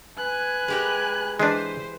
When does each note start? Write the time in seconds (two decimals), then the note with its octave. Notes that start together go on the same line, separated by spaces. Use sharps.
0.18 B4 G#5 F#6
0.68 G#3 G4 A#4
1.39 E3 G#3 D4 B4 C5